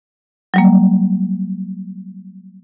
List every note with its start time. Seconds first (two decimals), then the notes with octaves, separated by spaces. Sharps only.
0.54 F#3 G3 A#3